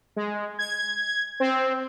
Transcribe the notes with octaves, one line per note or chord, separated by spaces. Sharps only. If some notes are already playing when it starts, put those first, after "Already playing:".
G#3
G#6
C4